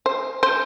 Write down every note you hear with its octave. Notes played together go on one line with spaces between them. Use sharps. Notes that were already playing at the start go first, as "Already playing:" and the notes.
C5
C5